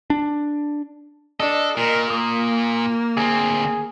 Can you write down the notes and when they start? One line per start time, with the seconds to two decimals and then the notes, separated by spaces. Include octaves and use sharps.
0.10 D4
1.40 D4 A4 D#5
1.77 A#2 A#4
2.10 A#3 D#6
3.17 D2 C4 G#4